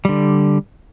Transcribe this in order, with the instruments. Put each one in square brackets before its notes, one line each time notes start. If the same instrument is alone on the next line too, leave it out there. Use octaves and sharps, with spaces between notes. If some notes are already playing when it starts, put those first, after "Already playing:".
[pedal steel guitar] D3 G3